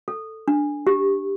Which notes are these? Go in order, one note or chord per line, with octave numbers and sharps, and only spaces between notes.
A4
D4
G4